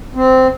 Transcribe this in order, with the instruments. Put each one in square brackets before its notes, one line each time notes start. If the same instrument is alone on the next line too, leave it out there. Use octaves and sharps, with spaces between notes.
[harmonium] C4